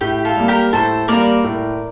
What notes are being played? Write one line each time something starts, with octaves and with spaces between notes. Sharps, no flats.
A2 G4
F4 A4
G3 A#3
G4 A#4
A2 A4 C5
G3 A#3 A#4 D5
A2